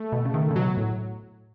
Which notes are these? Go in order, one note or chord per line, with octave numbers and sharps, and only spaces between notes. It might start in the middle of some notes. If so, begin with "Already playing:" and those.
Already playing: A3
B2
C#3
D#3
C#3
B2 F#3
A2